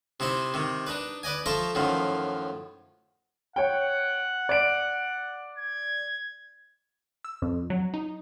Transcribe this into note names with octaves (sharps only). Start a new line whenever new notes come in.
C3 D#4 E4 C5
C3 D#3
D4 D#4 B4
B4 D5 D#5 G#5
F3 A4 E5 A#5 C6 C#6
F#2 A2 D#3 F3
C#5 F#5 G5
D5 D7
G#6
E6
F2
F#3
D#4